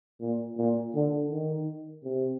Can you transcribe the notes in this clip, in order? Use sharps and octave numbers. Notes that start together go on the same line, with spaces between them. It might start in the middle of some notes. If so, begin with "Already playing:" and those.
A#2
A#2
D3
D#3
C3